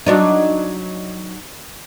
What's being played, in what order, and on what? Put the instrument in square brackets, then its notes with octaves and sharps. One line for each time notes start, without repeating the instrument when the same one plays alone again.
[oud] F#3 D4 D#4